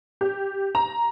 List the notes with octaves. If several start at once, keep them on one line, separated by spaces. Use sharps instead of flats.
G4
A#5